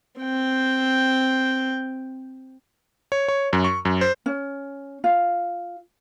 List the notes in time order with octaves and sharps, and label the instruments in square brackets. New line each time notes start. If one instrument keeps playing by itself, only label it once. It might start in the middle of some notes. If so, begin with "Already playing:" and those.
[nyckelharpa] C4 G5
[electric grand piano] C#5
C#5
F#2
C#6
F#2
C5
[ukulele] C#4
F4